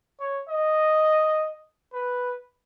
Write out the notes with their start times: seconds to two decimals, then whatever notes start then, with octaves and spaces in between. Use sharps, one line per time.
0.20 C#5
0.48 D#5
1.93 B4